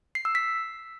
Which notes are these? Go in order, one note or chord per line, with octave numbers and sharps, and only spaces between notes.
C7
E6
B6